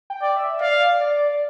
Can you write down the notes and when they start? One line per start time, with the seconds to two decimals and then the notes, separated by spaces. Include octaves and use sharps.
0.10 G5
0.22 D5
0.36 E5
0.61 D5 F5
1.01 D5